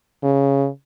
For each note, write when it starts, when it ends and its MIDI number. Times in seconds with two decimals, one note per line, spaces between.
0.23 0.68 49